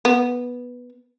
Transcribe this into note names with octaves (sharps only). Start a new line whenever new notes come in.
B3